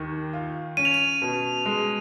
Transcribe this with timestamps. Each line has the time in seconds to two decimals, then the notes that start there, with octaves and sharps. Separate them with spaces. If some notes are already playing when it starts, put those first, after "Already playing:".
Already playing: D#2 D#3
0.33 F4
0.77 C#4 D#7
0.85 F7
0.94 D#7
1.22 B2
1.66 G#3